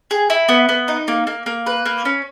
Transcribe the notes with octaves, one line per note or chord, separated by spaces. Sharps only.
G#4
E4
B3
B3
D#4
A#3
A#3
A#3
B4
A#3
C#4